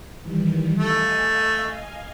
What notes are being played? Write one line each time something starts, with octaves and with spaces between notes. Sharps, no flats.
D#3 E3 G3
A3 D#5 F5 G#5